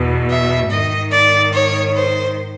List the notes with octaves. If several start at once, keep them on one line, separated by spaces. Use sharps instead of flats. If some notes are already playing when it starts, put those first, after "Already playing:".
Already playing: E2 B2
E5
G#2 D#3 D#5
D5
C#5
C5